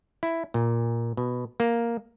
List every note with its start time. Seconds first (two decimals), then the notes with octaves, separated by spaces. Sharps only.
0.23 E4
0.54 A#2
1.17 B2
1.60 A#3